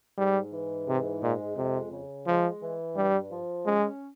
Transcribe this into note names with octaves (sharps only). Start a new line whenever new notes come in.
G#2 G3
E3
G#2 C3
A#2 G#3
F2 C3
C#3
F3 G#3
E3
G2 G3
F3
G#3 C#4